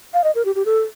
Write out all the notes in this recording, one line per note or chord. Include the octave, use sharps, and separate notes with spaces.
F5
D#5
A#4
G4
G4
A4